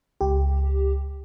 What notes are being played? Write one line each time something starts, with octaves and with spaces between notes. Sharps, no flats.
C#2 G4